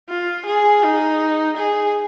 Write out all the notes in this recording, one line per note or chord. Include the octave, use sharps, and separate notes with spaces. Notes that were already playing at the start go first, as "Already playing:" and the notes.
F4
G#4
D#4
G#4